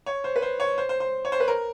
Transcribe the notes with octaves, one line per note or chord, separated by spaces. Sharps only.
C#5
C5
B4
C5
C#5
C5
C5
C5
C#5
C5
B4
A#4